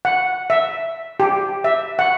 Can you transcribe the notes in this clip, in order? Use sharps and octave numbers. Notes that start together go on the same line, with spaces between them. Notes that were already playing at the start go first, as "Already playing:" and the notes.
F#5
E5
G4
E5
F#5